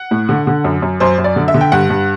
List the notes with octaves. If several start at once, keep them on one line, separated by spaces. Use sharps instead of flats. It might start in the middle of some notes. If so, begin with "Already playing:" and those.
Already playing: F#5
A2
D3
D3
F#2
F#2
F#2 C5
F#2
D5
D3
E5
D3
G5
G2 F#5
G2